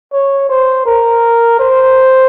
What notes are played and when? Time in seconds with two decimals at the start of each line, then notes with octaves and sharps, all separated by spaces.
0.13 C#5
0.49 C5
0.86 A#4
1.59 C5